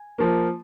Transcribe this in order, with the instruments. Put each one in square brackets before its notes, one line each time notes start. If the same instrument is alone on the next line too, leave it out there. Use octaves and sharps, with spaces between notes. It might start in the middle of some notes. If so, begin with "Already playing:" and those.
Already playing: [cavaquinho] G#5
[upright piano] F3 A#3